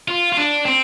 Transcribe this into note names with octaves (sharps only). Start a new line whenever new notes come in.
F4
F4
D4
C4